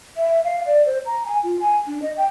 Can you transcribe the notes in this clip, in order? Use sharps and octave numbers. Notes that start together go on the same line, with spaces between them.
E5
F5
D5
C5
A#5
G#5
F4
G#5
D4
D#5
G5